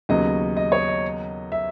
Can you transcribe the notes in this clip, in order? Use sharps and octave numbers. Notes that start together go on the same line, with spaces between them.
D#2 C#3 F#3 B3 D#5
D#5
C#5
D#5
E5